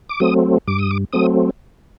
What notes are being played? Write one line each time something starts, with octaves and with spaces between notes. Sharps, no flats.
D6
F#3 A3 C4 D#6
G2 D6
D#6
D6
F#3 A3 C4 D#6